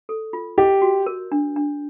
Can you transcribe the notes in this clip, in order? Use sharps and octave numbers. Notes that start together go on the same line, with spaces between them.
A4
F4
G4 D#5
F#4
A#4
D4
D4